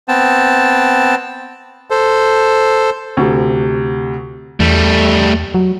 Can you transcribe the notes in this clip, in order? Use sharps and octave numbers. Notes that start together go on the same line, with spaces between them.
B3 C4 A5
A4 C5
D2 C3
E2 G3 A3
F#3